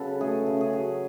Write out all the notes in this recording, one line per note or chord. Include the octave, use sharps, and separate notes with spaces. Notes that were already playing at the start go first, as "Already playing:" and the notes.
Already playing: C#3 F#3 A4 B4
A3 G#4
C#3
G#4
F#3